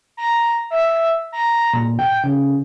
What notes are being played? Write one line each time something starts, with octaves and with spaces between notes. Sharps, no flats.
A#5
E5
A#5
A#2
G5
C#3